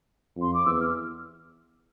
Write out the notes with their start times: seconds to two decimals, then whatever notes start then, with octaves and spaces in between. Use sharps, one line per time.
0.37 F2 C6
0.54 D6
0.66 E2 E6
0.80 F6